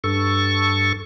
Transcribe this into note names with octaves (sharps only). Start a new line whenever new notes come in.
G2 A4 C#6